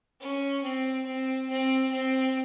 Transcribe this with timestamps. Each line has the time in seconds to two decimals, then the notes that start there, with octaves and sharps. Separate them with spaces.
0.21 C#4
0.63 C4
1.06 C4
1.50 C4
1.92 C4